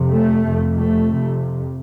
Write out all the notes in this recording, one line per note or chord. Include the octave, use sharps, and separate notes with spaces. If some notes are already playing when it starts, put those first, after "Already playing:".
Already playing: F2 C3
A3
F2 C3
A3
F2 C3